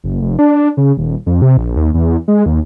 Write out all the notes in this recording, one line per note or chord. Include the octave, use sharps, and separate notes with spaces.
F#1
F1
D4
C#3
D#1
F2
C3
A#1
D#2
E2
G#3
D#2